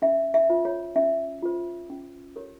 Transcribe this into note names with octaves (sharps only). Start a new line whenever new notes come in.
C#4 E5
E5
F4 C5
C#5
C#4 E5
F4 C5
C#4
G4 A#4 C#5